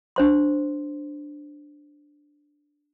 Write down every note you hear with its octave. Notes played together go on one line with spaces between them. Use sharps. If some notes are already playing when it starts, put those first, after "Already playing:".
D4 C5 C6